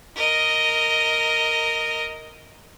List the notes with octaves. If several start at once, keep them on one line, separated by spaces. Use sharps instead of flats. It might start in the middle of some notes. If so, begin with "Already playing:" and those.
A#4 D#5